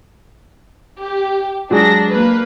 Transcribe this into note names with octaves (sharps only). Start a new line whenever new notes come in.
G4
F#3 G#3 D4 G#4 A#6
A#3 B4